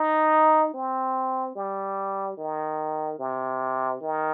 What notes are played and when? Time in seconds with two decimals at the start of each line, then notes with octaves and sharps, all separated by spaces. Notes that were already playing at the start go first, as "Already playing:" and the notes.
Already playing: D#4
0.74 C4
1.56 G3
2.38 D#3
3.19 C3
4.01 D#3